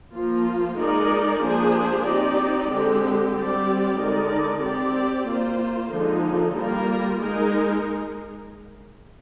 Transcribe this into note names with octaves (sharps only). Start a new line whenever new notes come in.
F3 A#3 F4
G#3 D#4 A#4 D5
F3 A#3 D4 G#4 C5
C4 D#4 G4 D5
D3 G#3 C4 G4
G3 C4 G4 D5
D3 G#3 D#4 A#4 D5
C4 G4 D5
A#3 F4 C5
D3 F3 G#3 D#4
G3 A#3 F4 A#4
G#3 D#4 A#4